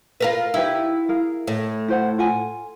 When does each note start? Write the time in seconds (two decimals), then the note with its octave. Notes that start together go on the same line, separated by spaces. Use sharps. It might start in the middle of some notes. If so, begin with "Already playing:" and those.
0.20 F4 A#4 B4
0.54 D#4 E4 G4 B4
1.09 G#4 A#4 F5
1.47 A2
1.88 E4 C5 F#5
2.18 F4 F#5 G#5